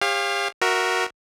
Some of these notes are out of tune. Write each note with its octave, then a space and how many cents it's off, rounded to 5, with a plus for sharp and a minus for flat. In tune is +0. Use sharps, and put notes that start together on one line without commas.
G4 +40 C#5 -40 F5 +0
F#4 +0 A#4 +5 E5 +0